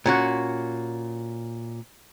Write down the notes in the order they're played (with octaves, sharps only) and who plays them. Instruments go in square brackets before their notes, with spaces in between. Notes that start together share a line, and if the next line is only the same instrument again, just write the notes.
[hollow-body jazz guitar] A#2 C#4 F#4